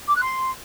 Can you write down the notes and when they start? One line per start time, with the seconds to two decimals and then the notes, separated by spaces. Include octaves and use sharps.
0.07 D6
0.15 F#6
0.23 C6